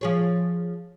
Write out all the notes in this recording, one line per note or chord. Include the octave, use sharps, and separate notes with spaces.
F3 G#4 C#5